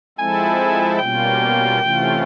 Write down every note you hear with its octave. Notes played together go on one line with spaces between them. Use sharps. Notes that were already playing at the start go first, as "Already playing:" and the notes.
F3 G#3 C4 E4 A4 G#5
B2 G3 A#3 C#4 F4 G5
C3 E3 A3 C#4 F4